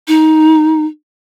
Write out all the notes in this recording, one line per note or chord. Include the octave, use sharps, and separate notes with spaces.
D#4